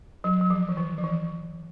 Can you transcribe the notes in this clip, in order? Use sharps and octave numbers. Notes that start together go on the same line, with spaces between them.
F#3
F#3
F3
E3
D#3
F3
E3